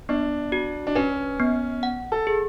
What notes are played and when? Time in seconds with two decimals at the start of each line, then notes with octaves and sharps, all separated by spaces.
0.09 B3 D4
0.52 F#4
0.87 D4
0.95 C#4 B4
1.40 B3
1.83 F#5
2.12 A4
2.27 G#4